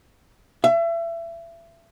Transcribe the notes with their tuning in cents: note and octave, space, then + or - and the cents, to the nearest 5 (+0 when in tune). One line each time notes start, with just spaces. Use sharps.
E5 +30